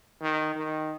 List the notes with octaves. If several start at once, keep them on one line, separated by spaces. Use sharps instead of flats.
D#3
D#3